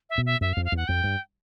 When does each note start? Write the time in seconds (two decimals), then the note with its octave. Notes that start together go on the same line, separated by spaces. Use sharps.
0.10 E5
0.18 B2
0.26 E5
0.41 F#2 E5
0.53 F5
0.57 F2
0.65 F5
0.72 E2 F#5
0.88 F2 G5
1.04 G2